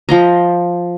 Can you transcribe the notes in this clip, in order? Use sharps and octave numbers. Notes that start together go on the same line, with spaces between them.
F3 D#5 A#5